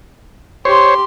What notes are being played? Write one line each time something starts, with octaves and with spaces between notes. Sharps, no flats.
G4 C5 C#5 C6